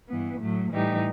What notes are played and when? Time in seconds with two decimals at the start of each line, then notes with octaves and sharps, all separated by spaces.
0.08 G2 E3 B3
0.39 A2 F#3 A3
0.71 A2 E3 G3 D#4 G4